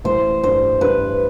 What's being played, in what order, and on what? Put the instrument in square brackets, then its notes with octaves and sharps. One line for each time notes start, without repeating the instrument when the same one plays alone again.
[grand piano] A1 [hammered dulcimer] C5
[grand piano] G2 [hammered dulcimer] C5
[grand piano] G2 [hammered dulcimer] B4